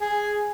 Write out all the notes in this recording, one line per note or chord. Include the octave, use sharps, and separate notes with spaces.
G#4